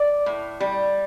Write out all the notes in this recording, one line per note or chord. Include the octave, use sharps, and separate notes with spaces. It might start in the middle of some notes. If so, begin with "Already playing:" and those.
Already playing: D5
A2
G3